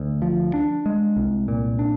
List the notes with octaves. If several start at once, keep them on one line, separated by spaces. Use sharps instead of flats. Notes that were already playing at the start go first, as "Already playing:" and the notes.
Already playing: D2
F3
D4
G#3
C2
A#2
D4